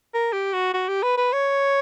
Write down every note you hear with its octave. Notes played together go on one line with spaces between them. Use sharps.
A#4
G4
F#4
F#4
G4
B4
B4
C#5